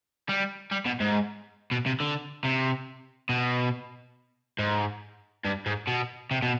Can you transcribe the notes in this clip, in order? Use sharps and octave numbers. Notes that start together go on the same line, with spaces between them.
G3
G3
B2
G#2
B2
C3
D3
C3
B2
G#2
G2
G#2
B2
C3
B2